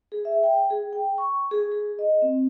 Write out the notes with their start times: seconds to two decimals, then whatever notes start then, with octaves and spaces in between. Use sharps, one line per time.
0.12 G#4
0.25 E5
0.44 G5
0.70 G#4
0.93 G5
1.18 C#6
1.51 G#4
1.72 G#4
1.99 D#5
2.22 C4